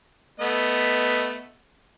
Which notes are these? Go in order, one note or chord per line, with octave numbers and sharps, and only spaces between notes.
A3 B3 D#5